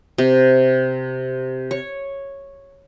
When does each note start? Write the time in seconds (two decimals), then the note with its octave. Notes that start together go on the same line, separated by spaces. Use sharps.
0.18 C3
1.71 C#5